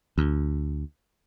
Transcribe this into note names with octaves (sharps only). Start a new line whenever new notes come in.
D2